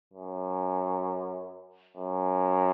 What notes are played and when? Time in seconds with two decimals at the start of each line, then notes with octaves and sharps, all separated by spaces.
0.14 F#2
1.97 F#2